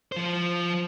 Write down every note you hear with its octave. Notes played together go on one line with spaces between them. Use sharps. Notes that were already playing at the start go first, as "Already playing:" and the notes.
F3 C5